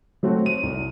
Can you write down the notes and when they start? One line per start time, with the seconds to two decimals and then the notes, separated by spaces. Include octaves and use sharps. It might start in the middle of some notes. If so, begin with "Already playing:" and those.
0.23 F#3 A3 C4 F#4
0.46 D#7
0.63 C2